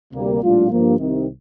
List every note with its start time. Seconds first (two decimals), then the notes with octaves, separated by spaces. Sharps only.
0.13 D2 C3 G3 A#3
0.41 A#1 A2 G3 D4 F4
0.69 G2 F3 A#3
0.97 C2 C3 D#3